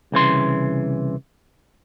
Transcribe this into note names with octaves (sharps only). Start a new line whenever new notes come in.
C2 C#3 E3 C6